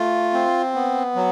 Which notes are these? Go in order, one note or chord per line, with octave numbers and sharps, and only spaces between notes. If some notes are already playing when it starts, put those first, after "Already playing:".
Already playing: A3 F4
C4
B3
F#3